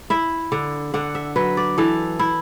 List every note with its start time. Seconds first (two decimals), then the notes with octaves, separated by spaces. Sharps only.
0.10 E4 E5
0.52 D3
0.94 D3 F#5
1.15 E5
1.36 F#3 B4
1.57 D5
1.78 E3 A4
2.19 E4